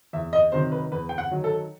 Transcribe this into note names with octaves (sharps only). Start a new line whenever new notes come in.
E2 E5
D#5
C3 D#3 F#3 C5
B4
E2 B4
G5
F#5
D#3 F#3
A4